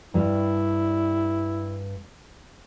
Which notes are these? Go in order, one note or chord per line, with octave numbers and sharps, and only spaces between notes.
G2 G3 E4